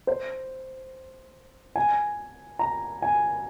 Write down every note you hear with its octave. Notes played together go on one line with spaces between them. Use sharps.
C5
G#5
A#5
G#5